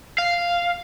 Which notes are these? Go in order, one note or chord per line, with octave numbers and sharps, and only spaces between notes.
F5